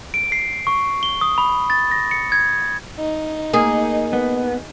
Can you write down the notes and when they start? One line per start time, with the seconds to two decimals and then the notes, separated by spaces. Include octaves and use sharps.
0.14 D7
0.32 C7
0.67 C#6
1.03 G7
1.21 D#6
1.38 B5
1.70 A6
1.91 A#6
2.11 C#7
2.32 G#6
2.99 D#4
3.53 A#3 G#4
4.13 B3